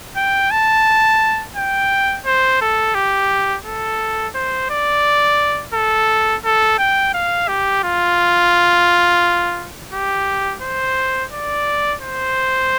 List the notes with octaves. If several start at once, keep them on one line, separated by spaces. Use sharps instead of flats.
G5
A5
G5
C5
A4
G4
A4
C5
D5
A4
A4
G5
F5
G4
F4
G4
C5
D5
C5